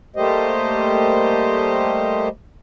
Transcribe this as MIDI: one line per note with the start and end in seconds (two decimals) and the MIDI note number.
0.16 2.28 55
0.16 2.28 57
0.16 2.28 58
0.16 2.28 67
0.16 2.28 72
0.16 2.28 75